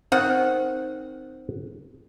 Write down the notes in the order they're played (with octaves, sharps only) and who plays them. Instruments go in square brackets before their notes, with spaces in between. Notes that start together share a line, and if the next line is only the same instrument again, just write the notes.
[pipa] D#3 F#5 [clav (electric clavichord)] C4